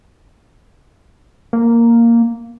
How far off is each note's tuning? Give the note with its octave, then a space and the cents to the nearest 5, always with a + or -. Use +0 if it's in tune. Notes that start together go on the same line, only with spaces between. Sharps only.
A#3 -5